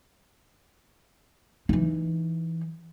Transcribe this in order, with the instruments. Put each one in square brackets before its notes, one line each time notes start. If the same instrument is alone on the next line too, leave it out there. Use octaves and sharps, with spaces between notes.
[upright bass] E3 D#4